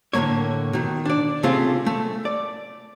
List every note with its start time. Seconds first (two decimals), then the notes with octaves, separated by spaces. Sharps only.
0.13 A2 D3 A3 A#3 C#5
0.73 B2 D#3
1.06 D4 D5
1.43 C3 A3 C4 C#4 F4 G#4
1.86 A3
2.25 D5